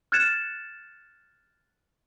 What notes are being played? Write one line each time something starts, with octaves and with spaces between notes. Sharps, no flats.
F6 F#6 G#6 A6 C#7 E7